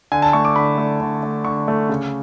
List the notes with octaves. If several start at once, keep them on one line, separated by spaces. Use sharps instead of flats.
D3 G#5
A5
A3 C#6
D6
D3 B5
A3
D3
A3
D3 C#6
A3
C#3